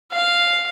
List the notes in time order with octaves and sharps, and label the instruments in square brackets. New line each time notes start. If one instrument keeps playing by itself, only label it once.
[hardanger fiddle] F5